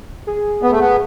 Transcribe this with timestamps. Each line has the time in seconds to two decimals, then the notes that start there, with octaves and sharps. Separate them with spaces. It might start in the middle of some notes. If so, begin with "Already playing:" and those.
0.27 G#4
0.63 B3
0.71 A3
0.80 B3